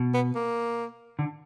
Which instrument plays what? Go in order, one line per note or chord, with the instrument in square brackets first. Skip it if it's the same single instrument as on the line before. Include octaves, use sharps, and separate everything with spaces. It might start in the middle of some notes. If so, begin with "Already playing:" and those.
Already playing: [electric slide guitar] B2
[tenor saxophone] B3
A#3
[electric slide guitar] D3